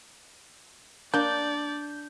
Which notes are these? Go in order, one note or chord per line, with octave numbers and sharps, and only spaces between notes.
A#3 D4 D5 G6